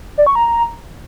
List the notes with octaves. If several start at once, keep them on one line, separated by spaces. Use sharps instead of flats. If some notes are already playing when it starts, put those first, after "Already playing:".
D5
C#6
A#5